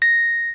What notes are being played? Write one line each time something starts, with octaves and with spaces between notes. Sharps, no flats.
A#6